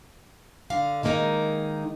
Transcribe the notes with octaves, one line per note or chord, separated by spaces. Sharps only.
D3 F5
D#3 G#3 A#3 C#4 D#4